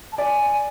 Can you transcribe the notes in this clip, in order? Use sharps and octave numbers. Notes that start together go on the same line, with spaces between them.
A5
D5 G#5